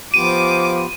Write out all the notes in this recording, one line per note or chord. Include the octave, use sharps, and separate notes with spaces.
F3 B3 F4 G4 D6 D#7